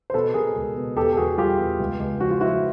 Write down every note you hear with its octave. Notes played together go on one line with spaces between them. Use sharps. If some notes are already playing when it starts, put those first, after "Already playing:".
C5
B2 A4 B4
B2 G#4 A#4
C#2
B2
E2 G4 A4
A4
E2 F#4 G#4
G3 F4 G4
E2
C#2
C#2
F3 F#4
F4
F3 E4 F#4